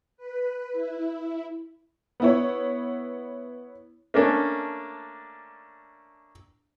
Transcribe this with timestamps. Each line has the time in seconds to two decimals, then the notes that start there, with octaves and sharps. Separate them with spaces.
0.17 B4
0.72 E4
2.20 B3 E4 C#5
4.14 A3 A#3 C#4 D4